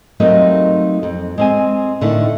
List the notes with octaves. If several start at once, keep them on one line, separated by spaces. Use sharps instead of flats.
F#3 G3 A3 A#3 C4 D#4
F2
G#3 C4 G#5
A2 D3 D#3 A3